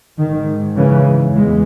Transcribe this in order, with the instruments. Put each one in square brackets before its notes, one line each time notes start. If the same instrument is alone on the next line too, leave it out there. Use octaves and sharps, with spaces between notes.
[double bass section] G#2 D#3
C#3 E3
E2 E3 G#3